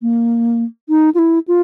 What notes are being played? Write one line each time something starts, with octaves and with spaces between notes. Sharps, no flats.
A#3
D#4
F4
E4
F4